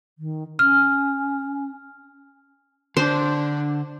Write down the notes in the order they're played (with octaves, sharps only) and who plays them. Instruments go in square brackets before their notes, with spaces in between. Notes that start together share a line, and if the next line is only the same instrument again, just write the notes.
[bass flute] D#3
[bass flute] C#4 [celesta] F6
[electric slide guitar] D3 [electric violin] D4 [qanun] C5